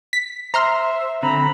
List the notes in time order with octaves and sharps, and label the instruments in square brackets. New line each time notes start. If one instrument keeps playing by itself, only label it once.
[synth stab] B6
[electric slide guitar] C5 [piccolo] E5 [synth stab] A#5 C6 F6
[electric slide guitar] D3 C4 [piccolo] A#5 [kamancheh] B5